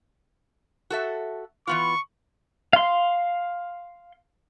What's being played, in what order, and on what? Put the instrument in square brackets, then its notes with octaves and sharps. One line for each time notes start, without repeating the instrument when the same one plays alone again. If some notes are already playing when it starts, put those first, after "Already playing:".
[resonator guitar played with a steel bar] F#4 A4 E5
[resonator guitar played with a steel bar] E3 B3 F4 [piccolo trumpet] C#6
[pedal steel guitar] F5 C6